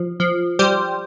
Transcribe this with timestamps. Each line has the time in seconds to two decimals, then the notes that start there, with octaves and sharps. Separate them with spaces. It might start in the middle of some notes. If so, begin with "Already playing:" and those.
Already playing: F3
0.20 F3
0.59 G3 G4 C5